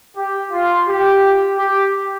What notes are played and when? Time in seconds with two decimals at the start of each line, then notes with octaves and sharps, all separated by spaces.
0.17 G4
0.52 F4
0.87 G4
1.58 G4